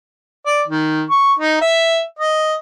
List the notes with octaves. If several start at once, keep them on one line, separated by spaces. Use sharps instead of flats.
D5
D#3
C#6
D#4
E5
D#5